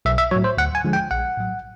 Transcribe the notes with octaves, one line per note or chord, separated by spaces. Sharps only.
B1 E5
E5
A2 F#3 C#5
C5
D2 F#5
G#5
D3 F3 G#3
G5
A#1 F#5
A2 F#3